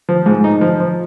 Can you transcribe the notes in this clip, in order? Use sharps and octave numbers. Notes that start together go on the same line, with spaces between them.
F3
G#2
D#4
F3
F3